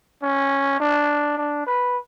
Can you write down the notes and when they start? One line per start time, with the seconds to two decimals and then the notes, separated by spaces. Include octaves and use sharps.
0.22 C#4
0.80 D4
1.38 D4
1.67 B4